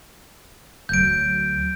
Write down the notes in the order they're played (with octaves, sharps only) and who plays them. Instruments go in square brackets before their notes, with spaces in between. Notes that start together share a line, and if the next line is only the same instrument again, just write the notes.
[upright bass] D2 F#3 [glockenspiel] G6 D7